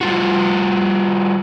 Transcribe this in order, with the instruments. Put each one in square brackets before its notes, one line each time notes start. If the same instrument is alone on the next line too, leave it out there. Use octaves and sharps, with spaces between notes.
[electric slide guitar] G3 F4 F#4